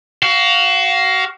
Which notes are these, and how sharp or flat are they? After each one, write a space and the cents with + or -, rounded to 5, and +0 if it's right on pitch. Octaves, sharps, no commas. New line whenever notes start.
F#4 +25 F5 +0